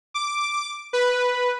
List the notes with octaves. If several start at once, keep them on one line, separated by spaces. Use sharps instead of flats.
D6
B4